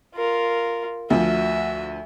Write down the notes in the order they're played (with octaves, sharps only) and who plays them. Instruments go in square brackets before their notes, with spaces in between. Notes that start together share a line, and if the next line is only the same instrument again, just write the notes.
[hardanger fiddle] F4 A#4
[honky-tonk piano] D2 F3 [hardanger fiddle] F#4 E5